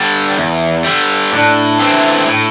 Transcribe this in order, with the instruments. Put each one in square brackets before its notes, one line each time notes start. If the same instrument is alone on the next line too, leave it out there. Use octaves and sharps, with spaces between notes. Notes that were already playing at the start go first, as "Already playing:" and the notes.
Already playing: [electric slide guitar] D3 G3
E2
D3 G3
[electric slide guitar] A2 [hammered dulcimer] D4
[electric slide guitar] E3 A3 C4
A2